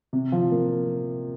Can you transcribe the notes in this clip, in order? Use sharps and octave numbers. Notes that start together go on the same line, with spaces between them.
C3
F3
A#3